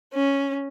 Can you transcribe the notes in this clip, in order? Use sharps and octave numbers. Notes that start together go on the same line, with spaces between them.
C#4